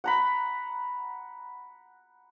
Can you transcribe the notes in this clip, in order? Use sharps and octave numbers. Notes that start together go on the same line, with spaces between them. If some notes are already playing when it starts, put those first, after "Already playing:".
F#5 A#5 B5